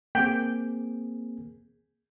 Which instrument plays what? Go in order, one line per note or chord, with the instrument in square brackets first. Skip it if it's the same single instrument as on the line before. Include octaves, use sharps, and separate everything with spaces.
[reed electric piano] A#3 C4 G#4 [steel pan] G5